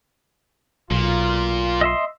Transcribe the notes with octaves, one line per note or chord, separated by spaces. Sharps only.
B1 A#2 F4
D#5 E5 C6